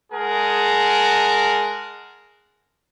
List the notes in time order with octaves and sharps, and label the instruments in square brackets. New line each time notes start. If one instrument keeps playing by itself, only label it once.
[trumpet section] G#3 G#4 A#4 F#5 A5